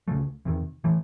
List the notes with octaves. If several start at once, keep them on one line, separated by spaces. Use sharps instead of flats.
C#2 C#3 F3 A3
E2 C3 D#3
E3 A3